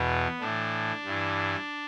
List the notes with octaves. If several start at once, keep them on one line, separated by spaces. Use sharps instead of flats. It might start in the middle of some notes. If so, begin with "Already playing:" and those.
Already playing: E2 B2 B3
A2 E3 D4
G2 E3